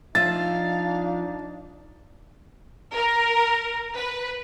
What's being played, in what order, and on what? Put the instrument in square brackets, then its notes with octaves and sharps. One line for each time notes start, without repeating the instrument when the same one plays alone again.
[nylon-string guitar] F3 E5 [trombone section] D4 D#4 [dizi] F5 [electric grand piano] A6
[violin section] A#4
B4